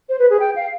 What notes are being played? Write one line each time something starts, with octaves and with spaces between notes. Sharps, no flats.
C5
B4
G#4
G5
F5